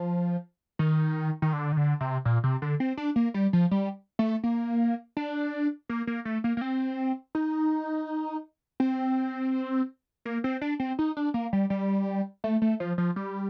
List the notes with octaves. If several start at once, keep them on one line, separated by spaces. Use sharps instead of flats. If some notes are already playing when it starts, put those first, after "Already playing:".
Already playing: F3
D#3
D#3
D3
D#3
D3
C3
A#2
C3
D3
C4
D4
A#3
G3
F3
G3
A3
A#3
D4
A#3
A#3
A3
A#3
A#3
C4
D#4
C4
A#3
C4
D4
C4
D#4
D4
A#3
G3
G3
A3
A3
F3
F3
G3